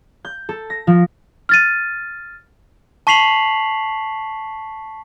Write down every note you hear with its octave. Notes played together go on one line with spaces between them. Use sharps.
G6
A4
A#6
F3
F6 A6 D#7
A5 C#6 B6 C7 F7 F#7